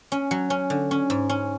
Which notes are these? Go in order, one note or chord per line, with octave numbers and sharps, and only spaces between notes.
C#4
F#3
C#4
D3
C#4
G#2
C#4